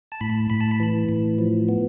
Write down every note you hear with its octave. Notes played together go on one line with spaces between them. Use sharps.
A5
A2 B5
A2 B5
A5
B5
E3
A2
F3
B3